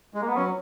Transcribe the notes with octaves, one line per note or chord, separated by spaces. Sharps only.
G#3
A#3
B3
F#3 C#4